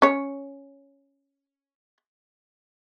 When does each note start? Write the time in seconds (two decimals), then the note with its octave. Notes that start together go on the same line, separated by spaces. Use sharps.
0.02 C#4 C#5